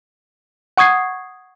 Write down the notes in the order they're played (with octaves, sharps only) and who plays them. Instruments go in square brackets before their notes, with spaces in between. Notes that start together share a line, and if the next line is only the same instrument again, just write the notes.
[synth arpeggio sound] F#5 C#6 D#6 G#6 C7